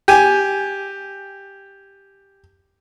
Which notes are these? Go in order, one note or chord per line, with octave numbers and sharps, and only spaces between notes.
G4 G#5